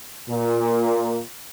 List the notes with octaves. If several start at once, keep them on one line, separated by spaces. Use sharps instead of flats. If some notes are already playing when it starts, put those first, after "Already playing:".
A#2